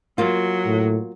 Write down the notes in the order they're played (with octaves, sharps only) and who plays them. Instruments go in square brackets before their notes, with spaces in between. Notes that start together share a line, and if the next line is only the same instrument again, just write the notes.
[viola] F#3 [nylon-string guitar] A#3 F4
[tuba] A2